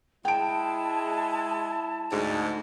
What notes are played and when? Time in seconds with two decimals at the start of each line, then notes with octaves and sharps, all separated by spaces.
0.25 G#3 E4 G5 A5 D7
2.12 D2 G#2